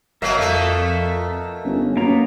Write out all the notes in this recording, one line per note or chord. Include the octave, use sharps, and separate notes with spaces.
G1 B2 F#3 A#3 A#4 E5 F5
F2 B2 A3
G1 C#4
F#2 A#3 B3 A#5